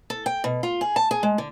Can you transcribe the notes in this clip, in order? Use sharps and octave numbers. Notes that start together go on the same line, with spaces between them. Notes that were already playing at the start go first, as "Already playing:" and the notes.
A4
G5
B2
F4
G#4
A5
G#4
G#3
D3